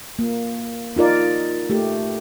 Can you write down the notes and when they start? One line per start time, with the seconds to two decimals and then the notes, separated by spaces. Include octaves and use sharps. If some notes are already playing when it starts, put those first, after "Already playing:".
0.19 A#3
0.96 D#4 F4 A#4 D5
1.70 A3 G4